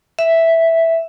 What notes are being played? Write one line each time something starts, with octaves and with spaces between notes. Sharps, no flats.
E5